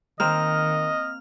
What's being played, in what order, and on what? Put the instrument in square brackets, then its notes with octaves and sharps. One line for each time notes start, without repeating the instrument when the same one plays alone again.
[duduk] D#3 [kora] A#3 C4 [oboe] D#5 [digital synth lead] F6